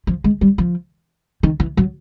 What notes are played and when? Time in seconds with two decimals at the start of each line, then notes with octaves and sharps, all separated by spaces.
0.07 F3
0.24 G#3
0.41 G3
0.58 F3
1.43 D#3
1.60 E3
1.77 F#3